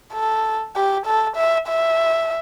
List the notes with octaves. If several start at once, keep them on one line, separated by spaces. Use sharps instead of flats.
A4
G4
A4
E5
E5